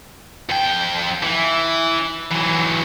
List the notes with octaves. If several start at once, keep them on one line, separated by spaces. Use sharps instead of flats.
F2 G5
E3
E3 F#3